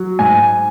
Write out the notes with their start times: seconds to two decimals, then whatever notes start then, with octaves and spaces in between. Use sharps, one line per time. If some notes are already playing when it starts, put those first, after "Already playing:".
Already playing: F#3
0.19 G#2 G#5